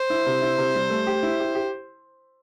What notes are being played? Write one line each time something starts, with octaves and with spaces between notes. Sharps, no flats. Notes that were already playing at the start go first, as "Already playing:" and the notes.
Already playing: C5
E4
C3
E4
C3
G3
A3
G4
E4
G4
G4